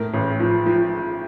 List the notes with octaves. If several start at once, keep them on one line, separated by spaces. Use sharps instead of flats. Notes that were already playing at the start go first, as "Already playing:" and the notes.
Already playing: A2 A#4
A1
F3
F3